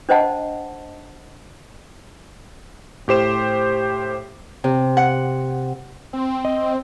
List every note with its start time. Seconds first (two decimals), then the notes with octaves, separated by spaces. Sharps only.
0.09 D4 C5 D#5 F#5 A5
3.08 A2 G4 C5 E7
4.64 C3
4.97 F#5
6.13 C4
6.45 D#5